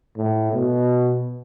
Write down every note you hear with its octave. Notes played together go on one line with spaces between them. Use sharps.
A2
B2